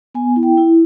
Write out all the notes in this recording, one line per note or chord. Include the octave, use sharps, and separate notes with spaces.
B3 G#5
E4
G5
E4